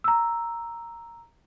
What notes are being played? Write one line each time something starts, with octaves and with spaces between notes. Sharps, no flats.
A#5 E6